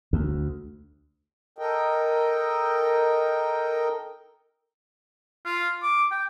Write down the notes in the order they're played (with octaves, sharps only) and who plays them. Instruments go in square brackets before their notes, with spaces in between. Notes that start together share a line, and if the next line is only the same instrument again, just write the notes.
[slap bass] D2
[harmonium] A4 A#4 D#5 G5
[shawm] F4
D6
G5